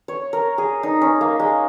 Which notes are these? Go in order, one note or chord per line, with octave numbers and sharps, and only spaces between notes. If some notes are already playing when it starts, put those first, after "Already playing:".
C#5
A#4
G#4
D#4
C#4
A#3
G#3